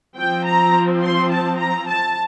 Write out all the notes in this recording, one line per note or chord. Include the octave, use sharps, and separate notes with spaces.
F3 C4 G5
A#5
C6
A5
A#5
A5